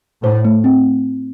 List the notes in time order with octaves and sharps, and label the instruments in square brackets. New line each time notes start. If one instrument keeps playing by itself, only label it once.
[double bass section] A2 [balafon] C5
[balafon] A3
C4